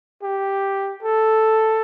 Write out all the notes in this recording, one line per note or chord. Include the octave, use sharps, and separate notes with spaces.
G4
A4